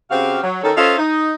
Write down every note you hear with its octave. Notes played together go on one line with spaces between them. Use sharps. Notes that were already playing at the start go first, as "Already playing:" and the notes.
C#3 C4 F#4 G4 F5
F#3
D#3 C#4 A4
C#4 F4 A4 C5 D#5 E5
D#4